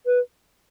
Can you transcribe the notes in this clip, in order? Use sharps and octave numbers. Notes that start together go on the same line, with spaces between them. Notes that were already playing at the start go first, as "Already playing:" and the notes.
B4